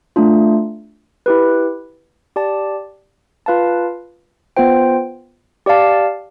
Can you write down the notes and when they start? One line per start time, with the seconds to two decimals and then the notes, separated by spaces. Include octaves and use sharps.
0.16 A3 D4 F4
1.26 E4 G4 B4
2.36 G4 D5 A5
3.46 F4 B4 F5 A5
4.57 B3 F4 C5 G5
5.66 G4 D5 F5 A5